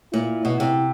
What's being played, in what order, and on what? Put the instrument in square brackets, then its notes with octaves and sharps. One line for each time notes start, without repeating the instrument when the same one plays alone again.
[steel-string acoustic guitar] A#2 [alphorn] E4
[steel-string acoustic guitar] B2
C3